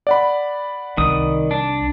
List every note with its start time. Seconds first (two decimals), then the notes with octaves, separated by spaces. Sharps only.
0.07 D5 F#5 B5
0.97 C2 D#3 D#6
1.51 D4